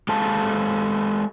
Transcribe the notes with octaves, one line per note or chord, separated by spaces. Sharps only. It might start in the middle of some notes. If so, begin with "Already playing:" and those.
G#3 G4 A4 F5 A5